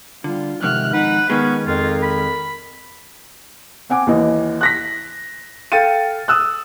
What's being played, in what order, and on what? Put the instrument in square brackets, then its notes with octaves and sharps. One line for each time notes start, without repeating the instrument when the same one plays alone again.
[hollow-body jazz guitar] D3 [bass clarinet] G3 [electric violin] F4
[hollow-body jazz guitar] F2 G#2 D#3 [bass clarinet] C3 [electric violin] F6 F#6
[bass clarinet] D#4 [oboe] B4 [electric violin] F#5
[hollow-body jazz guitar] D#3 G#3 [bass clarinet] B3 [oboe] C#4 [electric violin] B4
[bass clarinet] F2 [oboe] F4 [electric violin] A#4
[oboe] B5
[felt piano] C4 F#5 G#5 D6
D#2 E3 D#5
F#6 A#6 B6
A4 F5 G5 A6 C#7 D#7
D#6 E6 F#6